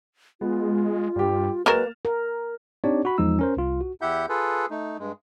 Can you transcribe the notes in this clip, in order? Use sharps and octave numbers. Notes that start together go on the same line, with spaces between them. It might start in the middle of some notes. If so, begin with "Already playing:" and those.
G#3 B3 F4
G2 G3 G4
F#3 G#3 A#3 A#4 B4 F6 A6 E7
A#4
C4 D4 D#4 G4 C#5 D5
F#4 B5
E2 F3 G#3 D#4 E6
C#4 A#4 C5
C2 F4
F#4
E2 E4 G4 E5 F#5 G6
F4 G#4 A4 B4
A3 D#4
G2 G#3